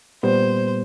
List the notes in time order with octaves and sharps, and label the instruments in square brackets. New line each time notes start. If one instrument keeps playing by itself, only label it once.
[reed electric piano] A#2 G3 B3 [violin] C5